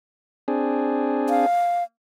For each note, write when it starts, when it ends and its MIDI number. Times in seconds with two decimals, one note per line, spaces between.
0.48 1.46 60
0.48 1.46 62
0.48 1.46 68
1.29 1.84 77